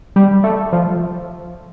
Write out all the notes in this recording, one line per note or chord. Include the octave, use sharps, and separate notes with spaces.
G3
A3
F3